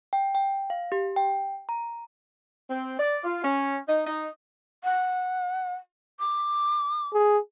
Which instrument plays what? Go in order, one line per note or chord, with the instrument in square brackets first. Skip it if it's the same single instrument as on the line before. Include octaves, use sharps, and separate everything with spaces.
[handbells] G5
G5
F5
G4
G5
A#5
[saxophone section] C4
D5
F4
C#4
D#4
D#4
[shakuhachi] F#5
D6
[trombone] G#4